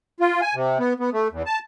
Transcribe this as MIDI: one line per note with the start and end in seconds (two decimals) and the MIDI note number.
0.20 0.41 65
0.42 0.54 80
0.55 0.78 48
0.79 0.93 59
1.00 1.10 59
1.13 1.28 57
1.32 1.43 40
1.46 1.59 81